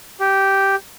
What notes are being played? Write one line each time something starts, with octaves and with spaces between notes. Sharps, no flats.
G4